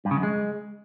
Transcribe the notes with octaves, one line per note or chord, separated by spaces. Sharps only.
G2
C#3
F#2
G#3